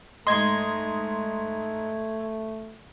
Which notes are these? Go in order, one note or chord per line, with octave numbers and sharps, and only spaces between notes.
G#2 A3 D#5 C6 G#6